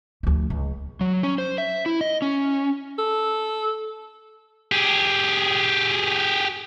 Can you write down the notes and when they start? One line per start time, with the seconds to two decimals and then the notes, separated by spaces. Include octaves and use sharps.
0.23 D2 F3
0.50 C#2
1.01 F#3
1.23 C#4
1.38 C5
1.58 E5
1.86 E4
2.01 D#5
2.22 C#4
2.99 A4
4.72 G4 G#4